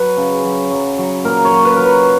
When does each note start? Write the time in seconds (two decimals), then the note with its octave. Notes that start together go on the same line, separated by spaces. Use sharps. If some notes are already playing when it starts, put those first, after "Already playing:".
Already playing: F#3 B4
0.17 C#3
0.44 F#3
0.71 F#3
0.98 F#3
1.24 A#2 A#4
1.45 C#5
1.52 F#3
1.65 B4
1.76 F#3 A#4
1.85 B4